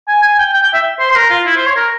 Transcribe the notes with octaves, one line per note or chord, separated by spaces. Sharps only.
G#5
G#5
G5
G5
G5
E5
C5
C5
A#4
F4
E4
C5
C#5
A#4